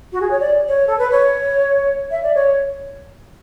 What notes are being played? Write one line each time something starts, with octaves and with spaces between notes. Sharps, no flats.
F#4
G#4
C#5
D5
C#5
A4
B4
C#5
E5
D5
C#5